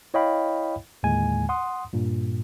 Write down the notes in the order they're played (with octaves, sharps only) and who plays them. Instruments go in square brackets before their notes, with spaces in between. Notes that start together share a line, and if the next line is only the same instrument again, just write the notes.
[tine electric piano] E4 C#5 D#5 F5 G5 B5
D#2 A2 D3 G#3 G#5
F#5 C6 D#6
G2 A#2